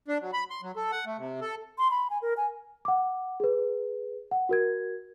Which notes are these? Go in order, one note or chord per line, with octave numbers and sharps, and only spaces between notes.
D4
F#3
B5
C6
F#3
A4
F#5
A3
C3
A4
C6
B5
G#5
A#4
G#5
F#5 D6
G#4 B4
F#5
F#4 A#4 G#6